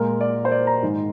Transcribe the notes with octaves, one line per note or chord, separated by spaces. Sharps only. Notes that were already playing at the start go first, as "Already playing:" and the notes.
Already playing: A#2 G#3 A#4
D5
C5
D5
A#5
G#2 D#3 G#3